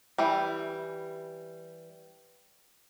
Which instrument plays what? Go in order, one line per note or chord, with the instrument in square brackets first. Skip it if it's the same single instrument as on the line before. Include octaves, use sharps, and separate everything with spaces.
[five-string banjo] E3 G3